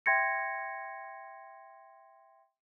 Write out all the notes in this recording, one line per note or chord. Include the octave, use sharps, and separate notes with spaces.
E5 G5 C6 G#6 A#6 C#7